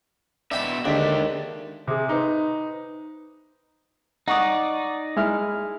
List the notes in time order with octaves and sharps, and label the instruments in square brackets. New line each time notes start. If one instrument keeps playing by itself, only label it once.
[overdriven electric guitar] B2 E5 [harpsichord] D4 G5 B5
[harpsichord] D#2 [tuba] D3 [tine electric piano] D#3 G#3 [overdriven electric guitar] D4 E5
[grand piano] C3 G#4
D#4 B4 C5
[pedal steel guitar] D#4 D5 [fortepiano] F#5 C#6 D#6
[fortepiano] G#3 E4 F6